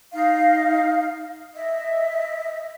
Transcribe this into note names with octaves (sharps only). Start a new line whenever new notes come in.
D#4 F5
D#5 E5